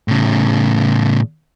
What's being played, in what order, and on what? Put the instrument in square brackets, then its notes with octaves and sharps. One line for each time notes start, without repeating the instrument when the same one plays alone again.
[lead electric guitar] A2 C#3